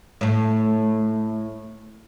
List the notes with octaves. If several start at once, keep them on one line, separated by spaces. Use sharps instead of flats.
A2 A3